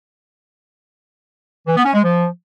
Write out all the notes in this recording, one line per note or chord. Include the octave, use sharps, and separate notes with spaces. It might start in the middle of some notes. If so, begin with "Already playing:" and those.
E3
B3
C#4
G#3
F3